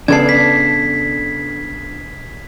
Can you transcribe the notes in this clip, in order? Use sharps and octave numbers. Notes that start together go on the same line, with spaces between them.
C#3 B3 D4 A4 D5 A5 G#6 C7
B6